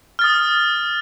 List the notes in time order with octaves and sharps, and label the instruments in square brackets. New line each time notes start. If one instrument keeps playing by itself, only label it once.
[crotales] F6
A6
D#6